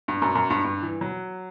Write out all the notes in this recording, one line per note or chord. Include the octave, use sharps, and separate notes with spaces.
G2
F#2
F#2
G2
G2
E3
F#3